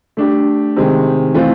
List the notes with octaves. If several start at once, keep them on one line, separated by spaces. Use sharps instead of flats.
A3 D4 G4
C3 D#3 G#3
E3 A3 C4 F4